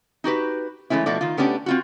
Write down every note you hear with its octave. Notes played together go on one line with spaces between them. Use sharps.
D#4 F#4 G4 B4
E3 G#3 A3 C#4 E4
B2 F3 A3 F#4 D5
D#3 F4
A3 B3 C#4 D4 G4
C4 F4 F#4